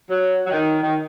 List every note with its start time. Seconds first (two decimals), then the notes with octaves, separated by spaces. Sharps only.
0.09 F#3
0.47 F#3
0.51 D#3
0.82 D#3